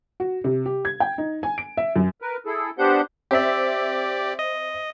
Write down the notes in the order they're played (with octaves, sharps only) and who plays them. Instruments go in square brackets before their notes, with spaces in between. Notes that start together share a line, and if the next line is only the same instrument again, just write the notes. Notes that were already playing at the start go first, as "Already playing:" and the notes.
[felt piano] F#4
C3
G4
G#6
G5
D#4
G#5
D7
E5
F#2
[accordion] A#4 B4
E4 G#4 A4
B3 D4 G4 C5 F#5 G6
[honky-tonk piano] C4 E5 [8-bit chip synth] G4 D5
[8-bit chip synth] D#5